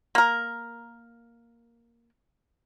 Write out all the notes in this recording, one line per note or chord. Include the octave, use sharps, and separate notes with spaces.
A#3 A#4